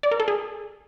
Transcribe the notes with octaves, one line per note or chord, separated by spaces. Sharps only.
D5
A#4
A4
G#4